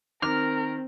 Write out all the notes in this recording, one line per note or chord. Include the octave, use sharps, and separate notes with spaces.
D#3 C4 A#4 F6